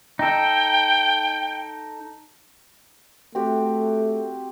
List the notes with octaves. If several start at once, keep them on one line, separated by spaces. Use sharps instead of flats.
D#4 A4 G5
A3 C4 F#4 G4